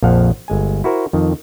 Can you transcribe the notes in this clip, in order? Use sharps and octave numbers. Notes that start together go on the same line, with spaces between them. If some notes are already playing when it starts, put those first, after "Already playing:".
A#1 F2 F3 F5 F#5
G1 G#3 G#5
E4 F#4 A#4 C5
F2 D#3